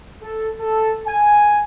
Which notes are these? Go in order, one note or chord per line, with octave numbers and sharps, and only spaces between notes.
A4
A4
G#5